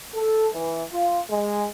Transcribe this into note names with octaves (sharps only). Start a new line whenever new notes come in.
A4
E3
F4
G#3